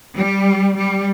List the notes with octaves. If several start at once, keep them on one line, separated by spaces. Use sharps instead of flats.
G3
G3